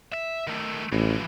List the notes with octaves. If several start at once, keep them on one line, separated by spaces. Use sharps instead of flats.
E5
D#3 A3
A1 E3 F3